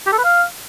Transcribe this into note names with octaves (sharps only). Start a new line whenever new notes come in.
G4
A4
B4
F5